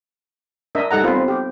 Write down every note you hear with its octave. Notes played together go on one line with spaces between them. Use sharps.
D4 A#4 D#5 E5
G3 D#4 A4 F#5 A#5
B3 C4 F4 B4
C4
G4